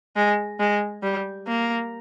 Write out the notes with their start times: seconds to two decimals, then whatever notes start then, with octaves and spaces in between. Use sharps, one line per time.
0.16 G#3
0.60 G#3
1.03 G3
1.47 A#3